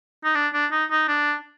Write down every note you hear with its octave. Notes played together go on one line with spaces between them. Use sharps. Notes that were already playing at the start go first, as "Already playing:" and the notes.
D#4
D4
D4
D#4
D#4
D4